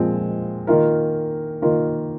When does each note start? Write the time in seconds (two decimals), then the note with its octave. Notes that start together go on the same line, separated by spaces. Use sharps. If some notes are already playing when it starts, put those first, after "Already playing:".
Already playing: A#2 F3 G#3 C4
0.67 D#3 A#3 F4 A#4
1.62 D#3 A#3 F4 A#4